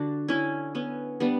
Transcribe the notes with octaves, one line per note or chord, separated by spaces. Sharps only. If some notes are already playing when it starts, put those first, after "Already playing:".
Already playing: D3 G3 D4 F#4
D3 C#4 E4
B3 C#4
G3 B3 D4